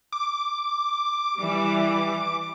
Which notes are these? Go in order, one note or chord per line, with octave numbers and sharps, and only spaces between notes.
D6
E3 G3